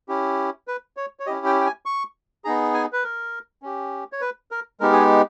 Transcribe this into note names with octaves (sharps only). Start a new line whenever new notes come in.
C#4 E4 G4
B4
C#5
C#5
C#4 E4 G4 D#5
G5
G5
G#5
C#6
B3 D#4 G#4 A#5
G#5
B4
A#4
C#4 G4
C#5
B4
A#4
G#3 B3 D#4 G4 A#4
G#4